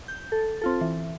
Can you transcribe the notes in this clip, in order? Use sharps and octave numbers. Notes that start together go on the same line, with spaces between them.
G6
A4
C4 F4 A4
E3